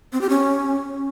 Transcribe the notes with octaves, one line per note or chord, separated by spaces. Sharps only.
C4
G4
C#4